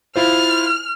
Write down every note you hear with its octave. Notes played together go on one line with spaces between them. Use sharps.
E4 F4 C5 F6